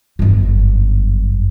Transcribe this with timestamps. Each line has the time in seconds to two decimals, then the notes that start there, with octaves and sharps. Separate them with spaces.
0.19 G1 F#2